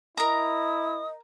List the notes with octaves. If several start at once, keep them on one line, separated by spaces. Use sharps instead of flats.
E4 A#4 D#5 A#5 D#6